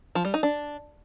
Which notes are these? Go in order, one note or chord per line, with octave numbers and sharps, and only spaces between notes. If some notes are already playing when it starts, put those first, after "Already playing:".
F3
G3
D#4
D4